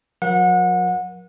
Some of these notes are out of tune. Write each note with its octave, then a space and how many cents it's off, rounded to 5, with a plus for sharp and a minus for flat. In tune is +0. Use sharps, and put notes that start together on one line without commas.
F#3 -45 A#4 +35 F#5 -30